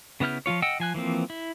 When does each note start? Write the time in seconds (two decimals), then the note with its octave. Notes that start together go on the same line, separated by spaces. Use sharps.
0.20 C#3 B3 E4 F6 G6
0.46 F3 A3 F4 C#5
0.62 D#5 F#5 G5 E6
0.80 F3 G#5 F#6
0.94 E3 F3 A#3 C4
1.30 E4